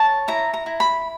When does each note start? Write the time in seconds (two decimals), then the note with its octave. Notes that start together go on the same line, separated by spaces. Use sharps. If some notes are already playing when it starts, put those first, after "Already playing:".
Already playing: C#5 A5
0.28 E4 A#5
0.54 A#5
0.66 E4
0.80 B5